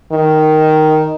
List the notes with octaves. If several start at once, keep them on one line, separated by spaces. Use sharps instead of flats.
D#3